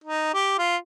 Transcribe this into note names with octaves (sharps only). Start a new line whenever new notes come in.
D#4
G4
F4